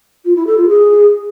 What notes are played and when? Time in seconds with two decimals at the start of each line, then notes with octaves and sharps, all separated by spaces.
0.25 F4
0.35 E4
0.46 A4
0.57 F4
0.68 G#4